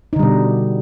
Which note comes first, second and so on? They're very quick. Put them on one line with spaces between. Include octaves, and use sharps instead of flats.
D#4 D3 G3 B2